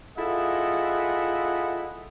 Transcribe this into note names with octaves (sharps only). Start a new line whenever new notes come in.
E4 F4 G#4 A4 D#5 F#5